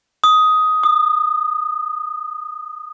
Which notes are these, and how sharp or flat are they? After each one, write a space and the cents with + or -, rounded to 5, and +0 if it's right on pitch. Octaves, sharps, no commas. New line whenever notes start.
D#6 +10
D#6 -30